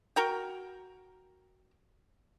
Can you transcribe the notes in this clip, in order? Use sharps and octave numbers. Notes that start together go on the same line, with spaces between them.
F#4 A#4 G5